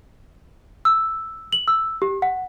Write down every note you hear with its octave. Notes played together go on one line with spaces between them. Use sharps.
E6
F#7
E6
G4
F#5